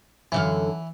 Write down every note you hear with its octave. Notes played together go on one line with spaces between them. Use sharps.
F#2 D3 E3 F5